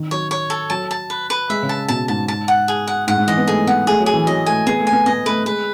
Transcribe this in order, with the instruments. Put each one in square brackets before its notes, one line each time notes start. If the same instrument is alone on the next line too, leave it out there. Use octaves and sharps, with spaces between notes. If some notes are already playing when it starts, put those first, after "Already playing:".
Already playing: [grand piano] D#3
[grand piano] F#3 [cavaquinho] C#5
[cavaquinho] C#5
A4
[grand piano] F#3 [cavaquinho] A5
[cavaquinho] A5
B4
B4
[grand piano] G#3 [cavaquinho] E5
[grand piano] C#3
[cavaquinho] A5
[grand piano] B2 [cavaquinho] A5
[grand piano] G#2 [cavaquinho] A5
[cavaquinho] A5
F#5
G#4
F#5
[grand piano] G#2 [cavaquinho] F#5
[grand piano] G#2
[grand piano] E3 [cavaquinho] D#5
[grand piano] B3
[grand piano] A3 [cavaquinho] G#4
[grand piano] B3 [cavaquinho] F#5
[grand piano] A3 [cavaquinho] G#4
[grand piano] F#3
[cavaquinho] G#4
[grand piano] E3
[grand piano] F#3 [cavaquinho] D#5
[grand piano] A3 [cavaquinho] G#5
[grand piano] B3 [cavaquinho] G#4
[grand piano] A3
[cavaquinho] G#5
[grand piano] B3
[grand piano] B3 [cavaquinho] D#5
[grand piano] A3 [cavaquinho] B4
[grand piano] G#3 [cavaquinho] B4